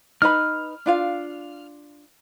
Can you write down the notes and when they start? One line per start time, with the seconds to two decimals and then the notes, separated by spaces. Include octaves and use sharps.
0.22 D#4 B4 B5 F6
0.86 D4 F4 F5